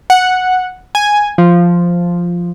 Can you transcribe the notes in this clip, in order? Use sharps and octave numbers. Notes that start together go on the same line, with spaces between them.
F#5
G#5
F3